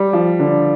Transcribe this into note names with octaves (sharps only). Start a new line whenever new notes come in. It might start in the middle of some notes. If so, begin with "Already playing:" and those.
Already playing: G3
F3
D3